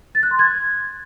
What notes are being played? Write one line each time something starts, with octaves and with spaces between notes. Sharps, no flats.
A6
F#6
C6
G#6